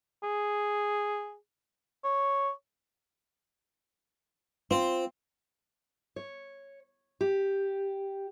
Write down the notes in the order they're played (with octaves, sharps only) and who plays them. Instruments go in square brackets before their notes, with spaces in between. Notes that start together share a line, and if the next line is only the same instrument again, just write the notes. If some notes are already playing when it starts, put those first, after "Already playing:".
[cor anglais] G#4
C#5
[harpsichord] C4 [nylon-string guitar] F4
[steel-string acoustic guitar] C#5
G4